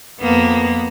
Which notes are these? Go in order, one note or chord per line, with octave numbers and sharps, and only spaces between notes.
F2 A#3 B3